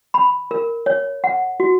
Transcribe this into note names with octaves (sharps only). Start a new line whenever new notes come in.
B5
A#4
C#5
F#5
F#4